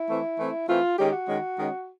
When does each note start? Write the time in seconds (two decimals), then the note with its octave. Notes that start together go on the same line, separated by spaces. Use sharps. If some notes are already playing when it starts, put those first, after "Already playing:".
Already playing: E4
0.09 E3 A3 C4
0.37 E3 A3 C4
0.68 E3 A3 C4 F4
0.98 D#3 G#3 C#4 G4
1.12 F#4
1.27 D#3 G#3 C#4
1.56 D#3 G#3 C#4